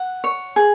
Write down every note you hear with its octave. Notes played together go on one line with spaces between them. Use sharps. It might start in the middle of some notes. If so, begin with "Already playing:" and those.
Already playing: F#5
C#5
G#4